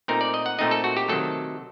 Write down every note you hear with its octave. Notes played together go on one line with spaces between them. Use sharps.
A#2 A3 C4 D#4 A#4
D5
D#5
F#5
A#2 A3 C4 D#4 D#5
A4
F#4
G4
C3 D#3 F#3 A3 A4